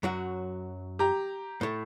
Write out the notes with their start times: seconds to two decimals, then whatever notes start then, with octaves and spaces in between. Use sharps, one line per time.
0.03 F#2 F#3 F#4
0.99 G4 A#5
1.61 A2 A3